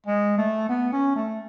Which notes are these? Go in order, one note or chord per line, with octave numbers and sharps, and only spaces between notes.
G#3
A3
B3
C#4
A3